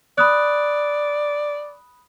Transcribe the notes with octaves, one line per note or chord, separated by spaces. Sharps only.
D5 B5 D#6 F#6